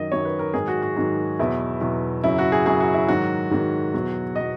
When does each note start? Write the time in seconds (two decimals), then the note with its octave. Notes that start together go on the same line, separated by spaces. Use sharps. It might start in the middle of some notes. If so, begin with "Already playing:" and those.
Already playing: F#2 D#3 F#3 D#5
0.12 F#2 D#3 F#3 C#5
0.25 B4
0.39 A#4
0.54 G#2 D#3 F#3 G#4
0.68 F#4
0.82 F#4
0.96 G#2 D#3 F#3
1.40 E2 B2 F#3 E4
1.81 E2 B2 F#3
2.24 F#2 C#3 F#3 E4
2.38 F#4
2.52 G#4
2.66 F#2 C#3 F#3 G#4
2.80 F#4
2.94 E4
3.08 G#2 D#3 F#3 F#4
3.51 G#2 D#3 F#3
3.94 E2 B2 F#3
4.36 B2 F#3 D#5